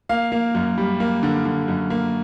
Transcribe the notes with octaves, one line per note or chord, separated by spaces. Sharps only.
A#3 F5
A#3
F#2
G3
A#3
D3
D3
F#2
A#3